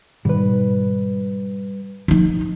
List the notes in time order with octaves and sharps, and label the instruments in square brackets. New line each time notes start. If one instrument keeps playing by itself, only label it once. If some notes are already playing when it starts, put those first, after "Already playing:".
[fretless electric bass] G#2 B2 D#3 [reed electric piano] G3 B4
[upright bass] F3 D#4